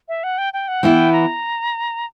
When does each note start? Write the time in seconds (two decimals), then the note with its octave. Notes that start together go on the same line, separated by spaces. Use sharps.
0.08 E5
0.23 F#5
0.38 G5
0.53 G5
0.68 F#5
0.83 E3 B3 E4 G5
1.12 A#5